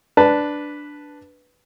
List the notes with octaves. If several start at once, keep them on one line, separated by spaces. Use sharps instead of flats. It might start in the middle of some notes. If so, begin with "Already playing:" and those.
D4 B4 A5